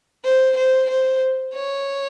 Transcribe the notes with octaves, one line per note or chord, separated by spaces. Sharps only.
C5
C5
C5
C#5